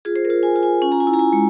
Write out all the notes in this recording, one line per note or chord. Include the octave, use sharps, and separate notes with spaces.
F4 G#4
C5
A#4
F4
G#5
F4
G#5
C#4 G#5
A#5
G#5
E4
A#5
G#5
G#3